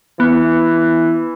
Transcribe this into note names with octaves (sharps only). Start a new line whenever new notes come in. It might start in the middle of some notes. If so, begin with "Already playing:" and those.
E3 B3